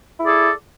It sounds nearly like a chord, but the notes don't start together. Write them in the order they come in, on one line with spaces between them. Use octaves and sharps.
E4 G#4 D5 A4